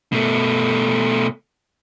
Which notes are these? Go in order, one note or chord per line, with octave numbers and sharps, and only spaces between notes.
B2 A3